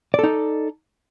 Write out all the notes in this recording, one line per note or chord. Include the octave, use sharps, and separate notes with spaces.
D#4 A4 D5